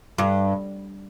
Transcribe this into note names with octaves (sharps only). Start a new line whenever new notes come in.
G2